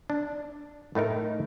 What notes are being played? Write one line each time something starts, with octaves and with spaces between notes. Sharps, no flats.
D4
A2 A3 D#4 A#4